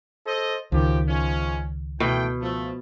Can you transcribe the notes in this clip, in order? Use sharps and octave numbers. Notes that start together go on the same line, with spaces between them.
A4 C5 D#5
C#2 D#3 F3 F#3 G4
F3 G#3 C#4
B2 E3 A3 G5
F3 A3